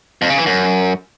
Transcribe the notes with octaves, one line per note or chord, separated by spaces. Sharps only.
F2
C#3
E3
F#2